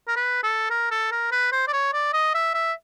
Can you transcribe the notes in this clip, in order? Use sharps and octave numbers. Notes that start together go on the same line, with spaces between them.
A#4
B4
A4
A#4
A4
A#4
B4
C5
D5
C#5
D5
D#5
E5
E5